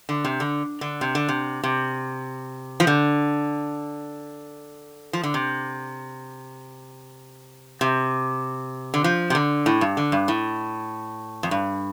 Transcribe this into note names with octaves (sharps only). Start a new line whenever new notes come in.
D3
C3
D3
D3
C3
D3
C3
C3
F3
D3
F3
D3
C3
C3
D3
F3
C3
D3
A2
G2
D3
G2
A2
F2
G2